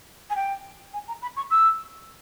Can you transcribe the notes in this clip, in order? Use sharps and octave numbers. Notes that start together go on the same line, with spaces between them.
G#5
G5
G#5
A#5
B5
C#6
E6